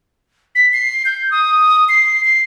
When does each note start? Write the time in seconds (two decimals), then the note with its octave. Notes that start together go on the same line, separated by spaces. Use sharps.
0.55 B6
0.73 C7
1.05 G6
1.31 D#6
1.89 C7
2.24 C7